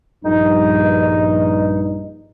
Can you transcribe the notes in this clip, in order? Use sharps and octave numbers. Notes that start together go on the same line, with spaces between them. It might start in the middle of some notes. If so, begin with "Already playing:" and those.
A#1 G2 D#4